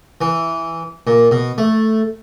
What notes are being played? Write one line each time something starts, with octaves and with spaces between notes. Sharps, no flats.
E3
A#2
B2
A3